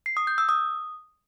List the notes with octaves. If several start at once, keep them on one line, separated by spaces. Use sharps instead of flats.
C7
D#6
G6
E6
D#6